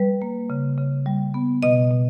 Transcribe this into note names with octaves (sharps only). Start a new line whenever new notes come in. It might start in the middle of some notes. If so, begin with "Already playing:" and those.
Already playing: G3 B4
A#3
C#3
C#3
G3
B3
B2 D#5
B2